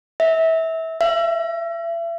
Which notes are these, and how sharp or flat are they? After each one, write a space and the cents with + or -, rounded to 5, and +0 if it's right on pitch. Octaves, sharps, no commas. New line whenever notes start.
E5 -25
E5 +35